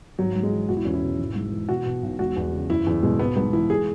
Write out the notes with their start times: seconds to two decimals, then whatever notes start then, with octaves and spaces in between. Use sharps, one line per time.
0.18 G#1 F#3
0.35 G#2
0.43 G#3
0.52 E3
0.69 E1 F#4
0.77 E4
0.85 E2 C#4
0.94 E4
1.02 B2
1.19 G#1
1.36 G#2
1.52 E3
1.69 B2 F#4
1.86 B2
2.03 B1
2.19 E1 F#4
2.36 E2
2.53 C#3
2.69 F#1 E4
2.87 E2
3.03 B2 G#3
3.19 G#1 B3
3.36 G#2 B3
3.53 E3 E4
3.70 G#4